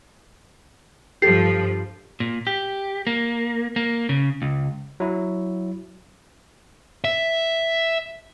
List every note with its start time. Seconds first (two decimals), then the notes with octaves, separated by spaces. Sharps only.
1.22 G2 F3 G4 A4 C7
2.20 A#2
2.47 G4
3.07 A#3
3.76 A#3
4.09 C#3
4.42 C#2
5.00 F#3 E4
7.04 E5